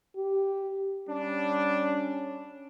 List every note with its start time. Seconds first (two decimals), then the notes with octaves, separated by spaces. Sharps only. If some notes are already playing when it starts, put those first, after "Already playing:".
0.17 G4
1.08 G3 C#4 D4